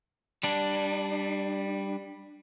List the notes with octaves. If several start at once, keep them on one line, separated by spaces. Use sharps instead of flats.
G3 D4